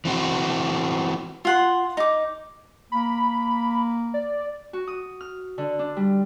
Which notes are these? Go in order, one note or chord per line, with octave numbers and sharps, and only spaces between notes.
E3 C4 F#4
F4 F#5 C6
D#4 D6
A#3 B5
D5
F#4
D#6
F6
D3
D4
G3